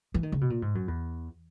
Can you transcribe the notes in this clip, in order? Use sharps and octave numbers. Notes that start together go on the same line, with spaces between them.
E3
D#3
C#3
B2
A#2
G#2
F#2
E2